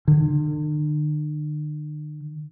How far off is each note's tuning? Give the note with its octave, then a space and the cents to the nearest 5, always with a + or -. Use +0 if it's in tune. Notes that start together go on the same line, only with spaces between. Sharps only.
D3 +45